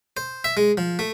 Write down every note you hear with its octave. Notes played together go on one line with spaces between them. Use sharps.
C5
E5
G#3
F3
A3